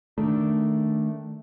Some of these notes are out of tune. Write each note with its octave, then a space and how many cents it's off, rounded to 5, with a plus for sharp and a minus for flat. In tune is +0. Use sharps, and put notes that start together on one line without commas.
D#3 +0 A3 +0 D4 +0